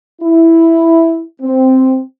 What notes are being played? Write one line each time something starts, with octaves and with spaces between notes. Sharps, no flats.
E4
C4